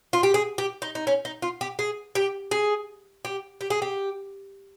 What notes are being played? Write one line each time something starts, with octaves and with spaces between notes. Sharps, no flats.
F4
G4
G#4
G4
D#4
D#4
C#4
D#4
F4
G4
G#4
G4
G#4
G4
G4
G#4
G4